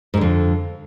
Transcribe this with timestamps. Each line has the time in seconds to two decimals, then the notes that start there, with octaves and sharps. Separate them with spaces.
0.14 G#2
0.17 D3
0.21 F2